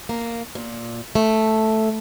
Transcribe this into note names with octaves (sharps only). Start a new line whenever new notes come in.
A#3
A#2
A3